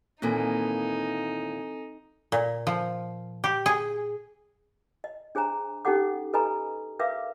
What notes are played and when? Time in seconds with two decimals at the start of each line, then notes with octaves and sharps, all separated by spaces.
0.22 D#2 A#2 E3 C4 D#4 A4 G#5
2.32 A#2
2.67 F3
3.44 G4
3.66 G#4
5.04 D#5
5.35 D4 G#4 C5 G#5 A#5
5.85 C#4 D#4 G4 A4 F#5 D6
6.33 A4 B4 D#5 G#5 A#5 B5
6.99 A#4 B4 E5 F5 D6